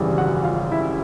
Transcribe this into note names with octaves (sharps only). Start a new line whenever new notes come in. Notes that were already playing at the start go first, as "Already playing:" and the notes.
Already playing: G#1 F#2 C#3 E3 G3
F#4 F#5
F4 F5
E4 E5